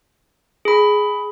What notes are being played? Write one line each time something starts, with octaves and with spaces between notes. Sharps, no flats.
G#4 B5